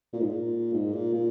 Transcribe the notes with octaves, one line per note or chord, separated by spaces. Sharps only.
A#2
G#2
A#2
G#2
A#2
A#2